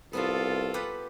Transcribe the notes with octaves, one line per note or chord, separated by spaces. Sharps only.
C2 B3 C4 F4 F#4 A4
G4 B4 F#5